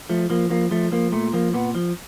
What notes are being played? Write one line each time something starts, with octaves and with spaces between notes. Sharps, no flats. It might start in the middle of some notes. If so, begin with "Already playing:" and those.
F3 A3
F3 A#3
F3 A#3
F3 A3
F3 A#3
A#2 A3
F3 A#3
A#2 B3
F3